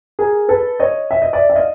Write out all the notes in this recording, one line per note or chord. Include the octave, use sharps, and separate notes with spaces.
G#4 A#4
A4 B4
C#5 D#5
E5
D#5
D5 E5
E5
D#5 F5